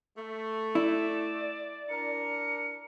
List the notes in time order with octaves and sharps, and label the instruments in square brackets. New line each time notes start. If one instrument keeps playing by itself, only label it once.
[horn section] A3
[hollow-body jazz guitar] E4 [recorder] D5 [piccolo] E7
[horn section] D4 A#4 [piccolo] C#7